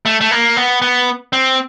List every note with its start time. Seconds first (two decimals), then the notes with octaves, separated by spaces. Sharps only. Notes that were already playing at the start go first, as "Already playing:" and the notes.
0.06 A3
0.21 A3
0.31 A#3
0.56 B3
0.82 B3
1.33 C4